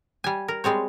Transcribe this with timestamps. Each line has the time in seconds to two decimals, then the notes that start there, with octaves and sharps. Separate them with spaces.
0.24 G3 G#5
0.48 A#4
0.64 G3 G#3 C4 C#5